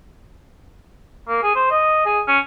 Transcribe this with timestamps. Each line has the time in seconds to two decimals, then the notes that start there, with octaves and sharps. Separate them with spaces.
1.28 A#3
1.43 G#4
1.55 C5
1.70 D#5
2.05 G#4
2.28 C#4